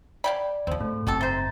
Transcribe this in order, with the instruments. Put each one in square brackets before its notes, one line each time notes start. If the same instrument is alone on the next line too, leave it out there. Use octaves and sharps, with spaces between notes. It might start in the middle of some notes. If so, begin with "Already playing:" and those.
[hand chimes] D5 [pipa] F5 G5 B5
[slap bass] D2 C#3 [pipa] F3 C4
[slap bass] G#2 [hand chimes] A3
[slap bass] F#1 G#2 C4 [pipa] F#4 G4 A4
[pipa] C3 C5 [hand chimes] A#5 A6